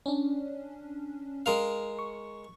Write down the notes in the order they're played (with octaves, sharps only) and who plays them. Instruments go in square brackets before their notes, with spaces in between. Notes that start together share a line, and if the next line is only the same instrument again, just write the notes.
[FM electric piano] C#4 D4
[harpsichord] G#3 A#4 F5
[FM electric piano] C#6